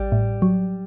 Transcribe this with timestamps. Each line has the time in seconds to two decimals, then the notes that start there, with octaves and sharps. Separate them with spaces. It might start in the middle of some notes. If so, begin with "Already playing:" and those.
Already playing: A1 G3
0.12 A2
0.42 F#3